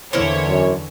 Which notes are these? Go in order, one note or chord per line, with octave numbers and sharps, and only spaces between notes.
E2 D3 E3 A#3 E4 C5 C#5
F#2